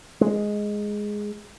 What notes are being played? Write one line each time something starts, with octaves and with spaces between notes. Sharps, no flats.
G#3